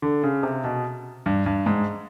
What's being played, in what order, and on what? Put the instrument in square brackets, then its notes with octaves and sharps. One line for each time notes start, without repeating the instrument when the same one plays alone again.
[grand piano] D3
C#3
C3
B2
G2
G2
G#2